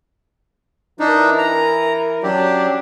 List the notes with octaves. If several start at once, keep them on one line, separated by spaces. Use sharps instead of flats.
E3 D4 D#4 A#4
A#5
F#3 C#4 D4 G4